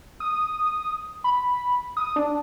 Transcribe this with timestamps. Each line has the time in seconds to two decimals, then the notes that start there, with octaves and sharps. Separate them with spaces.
0.20 D#6
1.24 B5
1.97 D#6
2.16 D4